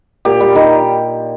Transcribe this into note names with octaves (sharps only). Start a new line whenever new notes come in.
A#2 G4
G3
D#3